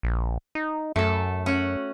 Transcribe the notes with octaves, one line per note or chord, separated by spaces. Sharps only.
A#1
D#4
F#2 A3 A4
C#4 F#4